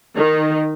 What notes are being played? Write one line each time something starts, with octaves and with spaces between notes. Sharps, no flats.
D#3